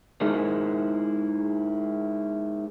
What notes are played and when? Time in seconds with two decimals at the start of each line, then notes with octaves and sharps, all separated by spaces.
0.21 G#3 D#4 E4 G#4 A#4